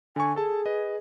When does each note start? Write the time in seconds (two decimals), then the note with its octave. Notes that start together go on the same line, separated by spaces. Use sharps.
0.16 D3 G#5 C#6
0.36 G#4 A4 A5
0.66 B4 D#5